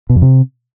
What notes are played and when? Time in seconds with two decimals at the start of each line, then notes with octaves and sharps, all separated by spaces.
0.09 B2
0.16 F2
0.22 C3